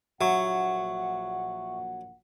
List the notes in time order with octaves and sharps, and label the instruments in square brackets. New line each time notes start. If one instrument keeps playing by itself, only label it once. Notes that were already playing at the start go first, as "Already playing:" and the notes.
[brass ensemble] A#1 A#2 F#5 [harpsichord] F#3 [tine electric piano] E5 C#6